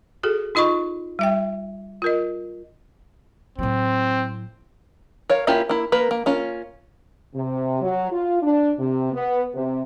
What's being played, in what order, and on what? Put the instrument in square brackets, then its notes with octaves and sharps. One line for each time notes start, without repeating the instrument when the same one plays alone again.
[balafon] F#4 G#4 A4
D#4 F4 D#5 B5 C#6
G3 E5 G5
F4 A#4 D#5
[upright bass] A2 F#3 [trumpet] C4
[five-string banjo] A#4 C#5 F5
A#3 C#4 E4 F4 G4
A#3 E4
A#3 A#4 B4
A#3
A#3 C#4 F4
[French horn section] C3
F#3
F4
D4
C3
B3
C3